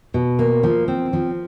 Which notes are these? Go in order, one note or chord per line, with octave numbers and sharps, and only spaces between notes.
B2
A#3
F3
C4
F3